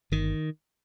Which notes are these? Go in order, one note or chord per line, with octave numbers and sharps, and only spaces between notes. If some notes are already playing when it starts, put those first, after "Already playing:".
G1 D#3